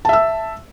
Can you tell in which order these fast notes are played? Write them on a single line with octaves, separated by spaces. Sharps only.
A5 E5 E6